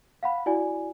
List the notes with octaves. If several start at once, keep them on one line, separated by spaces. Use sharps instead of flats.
F5 F#5 B5
E4 F#4 D5 G#5